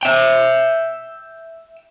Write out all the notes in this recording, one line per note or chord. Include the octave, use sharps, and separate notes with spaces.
E5 G5